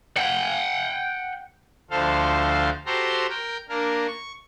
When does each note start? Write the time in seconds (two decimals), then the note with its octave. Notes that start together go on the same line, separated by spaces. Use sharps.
0.17 F#5 G5
1.91 D2 D3 F3 A4 C5 F5
2.86 F#4 G4 A4 C5 A#5 C6
3.30 A#4 G5
3.69 A#3 D4 A#4
4.08 C#6